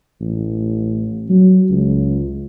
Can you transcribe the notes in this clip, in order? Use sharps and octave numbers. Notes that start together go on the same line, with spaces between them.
A1
F#3
C#2